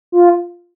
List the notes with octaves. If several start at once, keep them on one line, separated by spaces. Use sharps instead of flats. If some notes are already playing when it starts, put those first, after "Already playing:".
F4